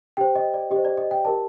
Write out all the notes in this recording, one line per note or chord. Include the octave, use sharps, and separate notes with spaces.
G4 C5 G5
D#5
D5
G4 C5 D#5
D5
D#5
G5
G4 A#4 D5 A5